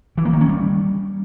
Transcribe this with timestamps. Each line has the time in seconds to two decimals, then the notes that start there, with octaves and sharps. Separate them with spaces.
0.18 E3
0.25 A#3
0.33 D#3
0.41 C#4
0.48 G3